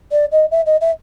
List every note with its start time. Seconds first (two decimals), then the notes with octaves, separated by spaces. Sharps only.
0.11 D5
0.31 D#5
0.51 E5
0.66 D#5
0.81 E5